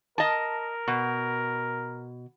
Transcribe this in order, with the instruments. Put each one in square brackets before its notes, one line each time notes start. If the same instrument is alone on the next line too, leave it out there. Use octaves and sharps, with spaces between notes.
[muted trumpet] A#4 [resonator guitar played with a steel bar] D#5 A5
[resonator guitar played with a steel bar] B2